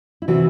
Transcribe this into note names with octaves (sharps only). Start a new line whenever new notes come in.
E4
C3 E3 F#4